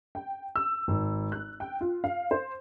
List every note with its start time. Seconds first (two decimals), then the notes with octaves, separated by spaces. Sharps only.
0.15 G5
0.56 E6
0.88 G#1
1.32 F#6
1.60 G5
1.81 F4
2.04 F5
2.31 C5